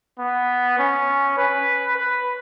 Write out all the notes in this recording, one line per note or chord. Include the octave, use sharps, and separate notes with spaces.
B3
C#4
B4
B4